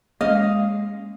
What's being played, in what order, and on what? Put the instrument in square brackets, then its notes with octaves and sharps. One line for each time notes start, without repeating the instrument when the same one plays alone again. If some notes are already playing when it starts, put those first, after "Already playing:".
[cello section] G#3 [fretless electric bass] A#3 C#4 [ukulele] D#5 [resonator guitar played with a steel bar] F5